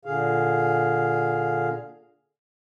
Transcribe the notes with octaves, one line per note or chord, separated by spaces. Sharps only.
A#2 D3 G#4 F5